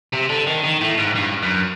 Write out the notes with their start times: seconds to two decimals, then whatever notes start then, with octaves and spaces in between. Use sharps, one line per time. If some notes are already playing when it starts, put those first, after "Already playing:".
0.13 C3
0.29 D3
0.47 D#3
0.64 D#3
0.82 A2
0.99 G#2
1.16 G2
1.43 F#2